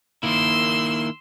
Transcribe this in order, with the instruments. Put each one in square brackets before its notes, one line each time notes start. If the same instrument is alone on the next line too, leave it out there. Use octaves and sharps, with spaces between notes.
[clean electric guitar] D#3 A#3 E4 [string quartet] C6 E6